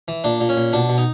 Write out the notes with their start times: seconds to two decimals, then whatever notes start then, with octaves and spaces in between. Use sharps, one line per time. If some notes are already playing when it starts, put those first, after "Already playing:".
0.08 E3
0.24 A#2 D4
0.41 A#2
0.49 C#4
0.57 A#2
0.73 B2 D4
0.89 B2
0.98 D#4